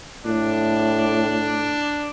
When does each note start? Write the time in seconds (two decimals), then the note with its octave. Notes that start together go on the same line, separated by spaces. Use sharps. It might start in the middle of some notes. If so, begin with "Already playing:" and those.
0.25 A2 D4